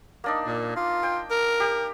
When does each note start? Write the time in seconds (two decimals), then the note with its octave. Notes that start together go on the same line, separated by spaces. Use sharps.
0.24 A#3 D4 D#4
0.46 A#2
0.76 F4
1.03 G5
1.31 A#4
1.60 G4